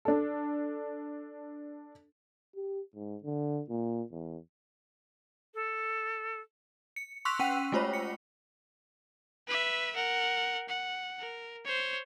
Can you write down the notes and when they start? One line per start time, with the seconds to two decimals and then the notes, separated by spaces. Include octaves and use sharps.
0.05 D4 A4
2.56 G4
2.95 G#2
3.24 D3
3.69 A#2
4.12 E2
5.54 A4
6.96 C#7
7.25 C6 C#6 E6 F#6 B6 F7
7.39 C#4 F#5 G5 B6 D#7
7.72 G#3 A3 F4 C5 C#5 B5
7.93 C#7
9.48 B4 E5
9.95 A#4 F#5
10.69 F#5
11.20 A#4
11.65 C5 C#5